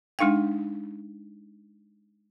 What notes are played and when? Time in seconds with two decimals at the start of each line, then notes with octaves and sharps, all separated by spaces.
0.19 G#3 D4 D#4 F5 G5